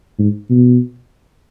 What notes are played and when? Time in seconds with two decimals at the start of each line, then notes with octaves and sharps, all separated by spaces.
0.19 G#2
0.50 B2